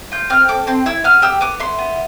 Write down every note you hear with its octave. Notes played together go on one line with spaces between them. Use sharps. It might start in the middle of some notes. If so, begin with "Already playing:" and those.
F4 G6
C4 F6
A4 D6
C4 C6
E4 E6
B3 F6
G4 E6
B3 D6
E4 C6
B3